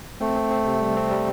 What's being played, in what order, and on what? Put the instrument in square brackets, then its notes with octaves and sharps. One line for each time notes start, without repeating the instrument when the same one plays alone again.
[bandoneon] A3 [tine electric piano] C4
[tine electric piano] C4
C4
C3
G3
C4
G3